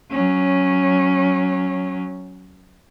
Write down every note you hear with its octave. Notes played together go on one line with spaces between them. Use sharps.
F#3 C#4